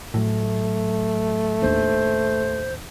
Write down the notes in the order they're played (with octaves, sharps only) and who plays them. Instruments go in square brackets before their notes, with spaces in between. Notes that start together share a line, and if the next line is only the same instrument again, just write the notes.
[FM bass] A2 [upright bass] F#3 [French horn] A3
[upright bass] D#2 D4 [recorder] C5